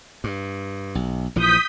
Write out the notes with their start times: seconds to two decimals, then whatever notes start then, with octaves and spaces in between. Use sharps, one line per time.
0.24 G2
0.95 B1
1.36 A#1 E3 F3 D#6 G6 B6